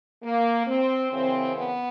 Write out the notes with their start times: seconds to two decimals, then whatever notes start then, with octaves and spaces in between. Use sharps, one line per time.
0.23 A#3
0.67 C4
1.12 F#2 C#3 E3 C4
1.57 B3